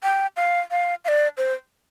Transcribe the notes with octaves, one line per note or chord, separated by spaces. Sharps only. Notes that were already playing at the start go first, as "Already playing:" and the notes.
G5
F5
F5
F5
D5
C5